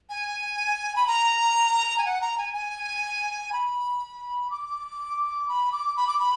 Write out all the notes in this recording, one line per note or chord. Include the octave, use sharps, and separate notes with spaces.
G#5
B5
A#5
G#5
F#5
A#5
G#5
G#5
B5
D6
B5
D6
B5
D6
B5